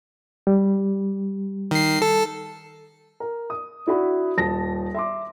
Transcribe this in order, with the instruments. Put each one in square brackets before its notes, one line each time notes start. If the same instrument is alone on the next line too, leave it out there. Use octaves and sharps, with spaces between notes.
[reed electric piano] G3
[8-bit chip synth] D#3 C7
A4
[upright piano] A#4
D#6
D4 E4 F#4 B5
D#1 A5 A#6
E5 C6 D6